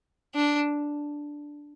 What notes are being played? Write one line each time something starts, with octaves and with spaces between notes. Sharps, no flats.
D4